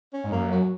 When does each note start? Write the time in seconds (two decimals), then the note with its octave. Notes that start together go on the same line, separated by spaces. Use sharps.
0.13 C#4
0.24 G#2
0.32 F#2 A#3
0.51 F#3